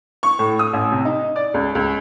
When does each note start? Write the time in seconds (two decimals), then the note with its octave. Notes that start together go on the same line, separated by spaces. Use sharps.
0.23 C#6
0.39 A2
0.59 D#6
0.73 A1
0.92 C3
1.05 D#4
1.36 D5
1.54 C#2
1.75 C#2